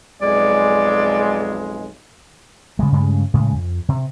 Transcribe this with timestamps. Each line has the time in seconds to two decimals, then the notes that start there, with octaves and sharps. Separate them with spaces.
0.22 B1 F2 G#3 D5
2.79 C#3 G3 G#3
2.92 G2 C#3 G#3 A3
3.34 A2 C#3 G#3 A3
3.54 F2
3.89 C3